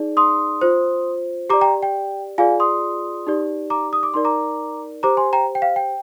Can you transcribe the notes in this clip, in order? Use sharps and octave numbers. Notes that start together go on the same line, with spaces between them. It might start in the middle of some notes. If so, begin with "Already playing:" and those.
Already playing: D#4 G#4 D5
C6 D#6
F4 C5
G4 D5 A#5 D6
G5 A#5
G5
F4 G#4 D5 F5 G#5
C6 D#6
D#4 G4 D5
A#5 D6
D#6
D6
D#4 A#4 D5 C6
A#5 D6
G4 C5 A#5 D6
G#5 C6
G5 A#5
G5
F5
G5